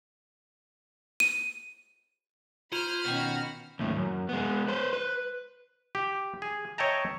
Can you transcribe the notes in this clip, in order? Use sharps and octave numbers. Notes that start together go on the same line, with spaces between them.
D#7
F4 C5 B5 F6 D#7 F7
B2 D#3 C#4 F#4 G5 G6
D#2 A2
F#2
G#3 B3
B4 C5
B4
G4
G#4
C#5 D#5 E5 G5 A5 A#5